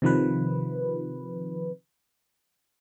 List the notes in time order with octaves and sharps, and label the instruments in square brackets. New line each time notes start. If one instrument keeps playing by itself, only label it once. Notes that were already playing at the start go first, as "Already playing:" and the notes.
[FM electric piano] C3 D#3 F3 B4